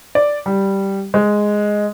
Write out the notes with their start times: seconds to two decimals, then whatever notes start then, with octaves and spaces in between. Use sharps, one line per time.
0.15 D5
0.46 G3
1.14 G#3